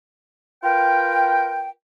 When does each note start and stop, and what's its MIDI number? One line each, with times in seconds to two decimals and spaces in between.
0.64 1.70 65
0.64 1.70 70
0.64 1.70 71
0.64 1.70 79